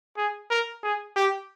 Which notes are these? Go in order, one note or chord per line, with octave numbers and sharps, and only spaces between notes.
G#4
A#4
G#4
G4